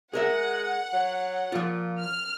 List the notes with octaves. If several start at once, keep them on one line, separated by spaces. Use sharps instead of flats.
G#3 G#4 A#4 E5 F#5
F#3
A#2 F3 F4
F6